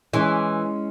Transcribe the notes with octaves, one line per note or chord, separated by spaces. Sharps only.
E3 G#3 C#4 C#5